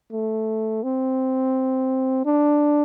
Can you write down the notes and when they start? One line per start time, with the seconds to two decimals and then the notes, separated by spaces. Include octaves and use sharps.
0.12 A3
0.83 C4
2.25 D4